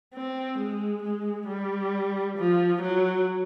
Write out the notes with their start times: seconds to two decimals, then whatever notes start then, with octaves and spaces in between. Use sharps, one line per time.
0.14 C4
0.59 G#3
1.03 G#3
1.48 G3
2.38 F3
2.82 F#3